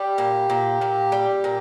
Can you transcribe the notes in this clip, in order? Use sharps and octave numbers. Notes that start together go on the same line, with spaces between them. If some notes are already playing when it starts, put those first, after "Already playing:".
Already playing: G3 G4
A#2
A#2
A#2
G3
A#2